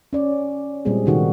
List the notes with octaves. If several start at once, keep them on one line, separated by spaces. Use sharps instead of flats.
C#4 D5
A#2 G3 G#3 C4 G#4
C3 D#3 F#4 A4